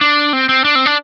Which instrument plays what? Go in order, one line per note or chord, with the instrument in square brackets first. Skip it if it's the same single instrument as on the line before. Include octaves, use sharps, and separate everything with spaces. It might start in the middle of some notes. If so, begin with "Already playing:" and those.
[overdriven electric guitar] D4
C4
C4
D4
C4
D4